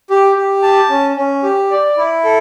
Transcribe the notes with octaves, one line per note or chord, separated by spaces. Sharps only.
G4
G4
A5
C#4
C#4
G4
D5
E4
A4